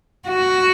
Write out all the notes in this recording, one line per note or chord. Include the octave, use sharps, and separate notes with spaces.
F#4